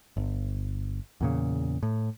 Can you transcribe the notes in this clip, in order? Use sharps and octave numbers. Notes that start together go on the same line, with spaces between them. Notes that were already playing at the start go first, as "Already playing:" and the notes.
G1
E2 A#2 C#3
A2